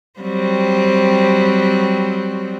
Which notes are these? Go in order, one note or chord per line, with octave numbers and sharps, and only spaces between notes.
F#3 G3 C4